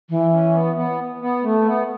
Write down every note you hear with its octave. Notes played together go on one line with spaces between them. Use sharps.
E3
C#4
B3
B3
B3
A3
B3